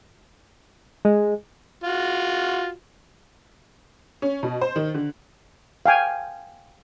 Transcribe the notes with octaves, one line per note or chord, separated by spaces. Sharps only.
G#3
F4 F#4
C#4
B2
C5
D#3
D3
F5 G5 G#5